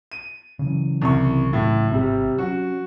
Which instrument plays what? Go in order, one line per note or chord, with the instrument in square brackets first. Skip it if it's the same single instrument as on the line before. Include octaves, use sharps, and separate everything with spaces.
[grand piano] D#7
[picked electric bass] C#3 E3 F#3
[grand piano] C2 C#6
A2
[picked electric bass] G#1 [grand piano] C3 G3
[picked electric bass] F#3 C#4 [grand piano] F#4